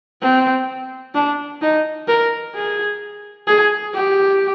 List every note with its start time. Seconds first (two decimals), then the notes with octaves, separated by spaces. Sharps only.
0.22 C4
1.14 D4
1.62 D#4
2.08 A#4
2.55 G#4
3.47 G#4
3.94 G4